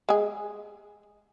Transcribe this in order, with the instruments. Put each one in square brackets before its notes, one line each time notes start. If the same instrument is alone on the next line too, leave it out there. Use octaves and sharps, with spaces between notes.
[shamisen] G#3 G#4